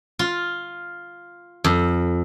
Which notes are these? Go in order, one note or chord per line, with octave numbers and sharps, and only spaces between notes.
F4
F2